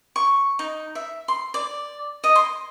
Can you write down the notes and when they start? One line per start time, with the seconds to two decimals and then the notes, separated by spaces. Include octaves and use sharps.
0.16 C#6
0.59 D#4
0.95 E5
1.28 C6
1.54 D5
2.24 D#5
2.35 C6